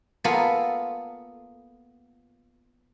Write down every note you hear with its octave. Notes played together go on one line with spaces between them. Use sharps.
A#3 B3 F4 G#4 A4